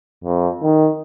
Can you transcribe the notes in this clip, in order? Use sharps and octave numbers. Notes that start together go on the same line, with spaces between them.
F2
D#3